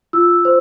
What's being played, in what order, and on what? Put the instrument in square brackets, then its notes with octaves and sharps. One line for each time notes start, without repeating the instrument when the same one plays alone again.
[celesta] F4 E6
C5